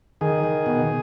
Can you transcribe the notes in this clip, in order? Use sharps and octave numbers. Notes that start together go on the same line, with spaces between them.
D#3 G#4
D#3
B2